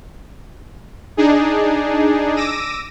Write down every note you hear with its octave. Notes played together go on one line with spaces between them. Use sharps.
D4 D#4 G#4
D6 E6 A#6 D#7